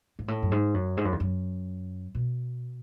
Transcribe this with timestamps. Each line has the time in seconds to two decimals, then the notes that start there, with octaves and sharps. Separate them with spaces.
0.19 G#2
0.28 A2
0.42 F#2
0.52 G#2
0.74 F#2
0.97 G#2
1.05 F#2
1.12 E2
1.20 F#2
2.15 B2